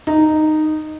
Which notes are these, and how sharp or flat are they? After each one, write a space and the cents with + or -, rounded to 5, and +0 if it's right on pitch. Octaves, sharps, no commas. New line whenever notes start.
D#4 -10